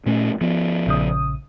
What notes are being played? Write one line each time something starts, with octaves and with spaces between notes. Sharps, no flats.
A#2 A3 C#4
F3 B3
A#1 C#3 D#6